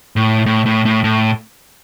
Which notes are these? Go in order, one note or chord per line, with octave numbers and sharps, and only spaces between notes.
A2
A2
A2
A2
A2